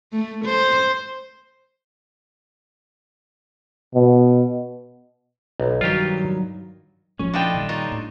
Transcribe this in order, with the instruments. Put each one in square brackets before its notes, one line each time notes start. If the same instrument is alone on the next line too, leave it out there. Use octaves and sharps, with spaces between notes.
[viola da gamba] A3
C5
[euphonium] B2
[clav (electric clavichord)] B1
[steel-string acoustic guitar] G2 D#3 F#3 [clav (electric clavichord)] F4 G4
[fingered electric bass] A#1 F3 A3 [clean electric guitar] C#4
[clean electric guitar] D4 A4 D#5 [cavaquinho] E4 F4 G5
[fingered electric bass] A#2 D#3 G3
[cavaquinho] D#4 F4 C#5
[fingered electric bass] A2